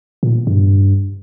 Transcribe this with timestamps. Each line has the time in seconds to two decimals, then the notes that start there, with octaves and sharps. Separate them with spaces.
0.23 A#2
0.47 G2